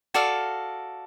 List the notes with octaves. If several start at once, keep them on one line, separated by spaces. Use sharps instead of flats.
F#4 A4 D5 F5